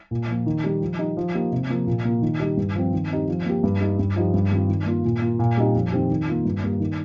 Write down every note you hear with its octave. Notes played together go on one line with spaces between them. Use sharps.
A#2
F3 A#3
D#3
G3 D#4 G4
F3
D#4 G4
F3
A#3 D#4 G4
C3
F3 A#3
A#2
A#3 F4
D#3
G3 D#4 G4
G2
F3 C4
D#3
C4 D#4 G4
F3
A#3 G4
G2
G3 D#4
G2
F3 D#4 G4
G2
D#3 G3 C4 F4
D#3
A#3 F4
A#2
A#3 F4
A#2
G3 C4 D#4 G4
F2
D#3 C4 G4
D#3
A#3 F4
G2
G3 A#3
D#3